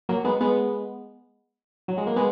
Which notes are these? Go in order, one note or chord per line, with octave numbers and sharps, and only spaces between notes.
F#3 A#3
G#3 B3
G#3 B3
F#3
G#3
A#3
G#3 B3